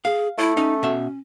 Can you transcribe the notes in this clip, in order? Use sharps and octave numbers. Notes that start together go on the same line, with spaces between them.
G#4 F5
A3 E4
C#4 D#4
B2 E5